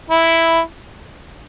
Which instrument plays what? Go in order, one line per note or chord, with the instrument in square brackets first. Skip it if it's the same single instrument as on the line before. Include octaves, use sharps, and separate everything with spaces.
[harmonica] E4